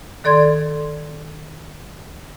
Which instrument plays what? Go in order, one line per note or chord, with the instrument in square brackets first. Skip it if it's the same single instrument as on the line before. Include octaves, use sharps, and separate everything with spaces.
[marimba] D#3 A4 D5 C6 G#6